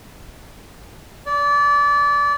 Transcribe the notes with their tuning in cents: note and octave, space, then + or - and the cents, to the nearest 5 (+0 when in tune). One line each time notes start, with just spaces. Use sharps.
D5 -25